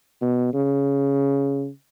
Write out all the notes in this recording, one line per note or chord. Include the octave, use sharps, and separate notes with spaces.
B2
C#3